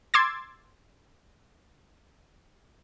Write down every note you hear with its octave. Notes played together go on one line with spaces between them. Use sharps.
C6 D6 E6 G#6 A6